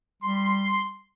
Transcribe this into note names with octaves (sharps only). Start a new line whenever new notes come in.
G3 C6